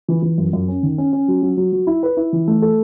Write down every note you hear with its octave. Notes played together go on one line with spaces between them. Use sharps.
E3
E3
F#2
F#2
C#4
D#3
C#4
C#4
F#3
F#3
F#3
F#3
E4
B4
E4
E3
A3
A4